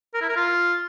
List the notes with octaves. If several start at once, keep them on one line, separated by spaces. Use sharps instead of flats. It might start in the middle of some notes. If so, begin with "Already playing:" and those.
A#4
E4
A#4
F4